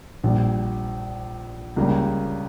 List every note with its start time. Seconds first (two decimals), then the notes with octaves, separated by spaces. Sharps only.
0.24 A#1 A#2 G3
1.76 C#2 C#3 G3 A#3